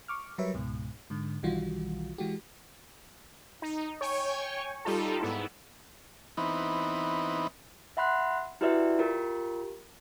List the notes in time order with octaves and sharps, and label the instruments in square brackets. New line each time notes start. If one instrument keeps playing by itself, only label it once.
[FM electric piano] C#6 D6 F6
F#3 G3 A#4 B4 C#5 E5
C#2 G#2 B2
G#2 D3
B1 D#3 E3 G3 F4 F#4
E3 G#3 F#4 G4
[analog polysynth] D#4
C#5 G5 G#5 C#6
G3 D#4 F4 A4
G#2 B3 E4
[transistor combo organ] E3 B3 C4 D#4
[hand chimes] E5 F#5 B5 C6 F#6
E4 F#4 G4 B4 D5 E5
F4 G4 A#4